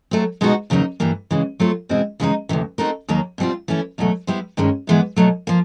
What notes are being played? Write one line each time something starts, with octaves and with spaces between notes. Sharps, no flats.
F#3 A3 C4
B2 G#3 B3 D#4 F#4
E2 C#3 F#3 A#3 D#4
G2 E3 G3 A#3
C#3 E3 G#3
F#3 A3 C4 F4
E2 B2 G#3 C4 E4
C#3 E3 G#3 B3 D#4
D2 C3 E3
A3 C4 D#4 F#4 A#4
D#2 D#3 F#3 A#3
B2 G3 C4 F4
E3 A3 C#4 E4
E2 B2 F#3 A3
G3 B3 E4 G4 C5
G2 D#3 G#3 C#4
G#2 E3 G#3 B3
B2 F#3 A3
F3 A#3